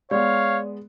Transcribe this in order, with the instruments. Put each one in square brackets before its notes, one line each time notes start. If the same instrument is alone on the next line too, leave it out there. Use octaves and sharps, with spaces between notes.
[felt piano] G#3 B3 [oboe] C#5 [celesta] D5 [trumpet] F5